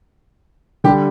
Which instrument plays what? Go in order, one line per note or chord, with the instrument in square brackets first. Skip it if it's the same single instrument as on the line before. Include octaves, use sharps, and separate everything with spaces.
[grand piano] D3 G3 D4 [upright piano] G4